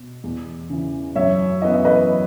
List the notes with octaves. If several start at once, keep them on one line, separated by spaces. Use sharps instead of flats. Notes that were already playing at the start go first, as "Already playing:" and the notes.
Already playing: B2
E2
C#3 E3
F#2 C#5 E5
E3 B3 D#5
E5
B4 D#5